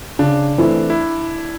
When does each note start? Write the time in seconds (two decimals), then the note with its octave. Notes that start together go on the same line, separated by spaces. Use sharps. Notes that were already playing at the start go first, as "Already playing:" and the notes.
0.19 C#3 D4
0.58 E3 A3 C4 E4
0.90 E4